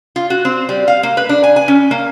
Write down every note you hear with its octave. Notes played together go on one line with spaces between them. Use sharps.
F4
F#4
C4
G3
F5
A#3
B4
D4
G#5
G#5
C#4
A#3